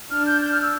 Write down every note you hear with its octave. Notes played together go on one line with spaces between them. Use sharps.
D4 F6
G6
G6
F6
E6